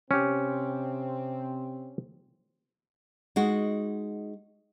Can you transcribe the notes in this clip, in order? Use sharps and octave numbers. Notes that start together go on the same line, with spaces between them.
C3 C4 C#4 G4
G#3 D#4 F#4